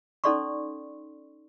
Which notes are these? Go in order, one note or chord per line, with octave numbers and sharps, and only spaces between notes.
C#4 D#4 A4 D5 C6 C#6